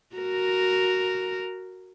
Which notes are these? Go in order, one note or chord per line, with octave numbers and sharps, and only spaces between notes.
F#4 A#4